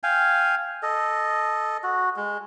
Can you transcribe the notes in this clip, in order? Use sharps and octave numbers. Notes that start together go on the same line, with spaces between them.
F5 G5 G#5
A4 D#5
F#4
G#3